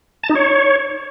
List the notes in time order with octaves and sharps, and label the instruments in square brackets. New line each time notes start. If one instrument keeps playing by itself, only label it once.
[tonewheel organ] A5
D#4
C#5